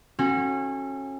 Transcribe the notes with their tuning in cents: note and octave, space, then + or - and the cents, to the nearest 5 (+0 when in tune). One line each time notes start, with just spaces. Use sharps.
C#4 -30 F#4 -5 A4 +0